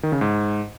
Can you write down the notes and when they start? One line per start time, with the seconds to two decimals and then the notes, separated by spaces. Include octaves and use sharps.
0.03 D#3
0.12 C#3
0.21 G#2